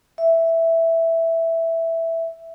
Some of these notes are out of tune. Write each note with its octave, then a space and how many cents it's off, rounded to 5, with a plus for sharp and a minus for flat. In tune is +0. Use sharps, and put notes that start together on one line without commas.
E5 +0